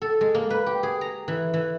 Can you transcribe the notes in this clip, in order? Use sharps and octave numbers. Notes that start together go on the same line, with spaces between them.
A4
G#3
A#3
B4
G4
G#4
A#5
E3
E3